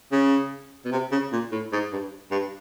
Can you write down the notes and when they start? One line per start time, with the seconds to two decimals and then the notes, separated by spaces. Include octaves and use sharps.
0.12 C#3
0.85 B2
0.92 C3
1.12 C#3
1.32 A#2
1.52 A2
1.73 G#2
1.92 G2
2.31 G2